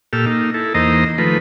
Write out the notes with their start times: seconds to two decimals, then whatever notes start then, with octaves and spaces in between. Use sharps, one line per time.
0.13 A#2 G4 A4 E6 F6
0.26 A#3 D#4
0.54 E4 A4
0.74 E2 A#3 D#4 C5 D#5 A#5
1.18 D#3 F3 A3 B4